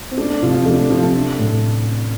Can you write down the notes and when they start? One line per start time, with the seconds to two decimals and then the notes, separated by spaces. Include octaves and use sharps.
0.11 C4
0.17 A3 D4
0.30 D4
0.42 C3 F3 F4
0.54 F3 F4
0.66 A3 D4
0.78 D4
0.90 C3 F3 F4
1.03 A3 A4
1.15 D4
1.39 A2